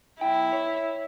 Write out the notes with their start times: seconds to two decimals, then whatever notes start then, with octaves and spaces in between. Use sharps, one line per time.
0.21 B1 E4 G5
0.53 C#5